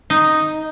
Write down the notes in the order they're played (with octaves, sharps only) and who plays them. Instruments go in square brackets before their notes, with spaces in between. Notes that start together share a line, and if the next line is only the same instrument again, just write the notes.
[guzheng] D#4